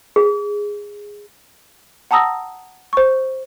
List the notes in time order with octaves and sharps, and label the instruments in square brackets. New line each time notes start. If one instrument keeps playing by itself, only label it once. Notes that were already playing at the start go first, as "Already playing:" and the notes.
[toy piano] G#4
[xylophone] F#5 A5 A#5 D#6 E6 A#6
C5 C#6